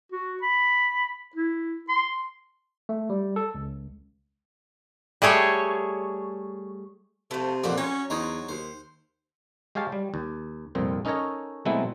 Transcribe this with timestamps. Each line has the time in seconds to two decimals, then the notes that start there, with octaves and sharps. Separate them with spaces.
0.12 F#4
0.43 B5
1.36 E4
1.89 C6
2.89 A3
3.10 G3
3.36 A4
3.55 C#2
5.22 G3 A3 G#4 C#5
7.31 C3 F3 A3
7.64 F2 A#2 F3 G4 C5 F#5
7.78 F#3 C#4 C#5
8.10 E2 D#4 C5 C#5
8.49 D#2 C5
9.75 G#3 G4 C#5 F5 A5
9.92 G3
10.14 D#2
10.75 C2 F2 A#2 C4
11.05 C#4 D#4 A4 A#4 C#5 D#5
11.65 B2 F#3 G#3 A3 C4 E4